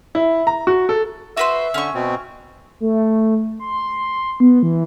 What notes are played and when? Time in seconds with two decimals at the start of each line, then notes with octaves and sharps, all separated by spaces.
0.15 E4
0.47 A#5
0.67 F#4
0.89 A4
1.37 F#4 B4 C5 E5
1.74 D3 C#4 C#6
1.95 B2 C4
2.80 A3
3.60 C6
4.40 B3
4.63 E3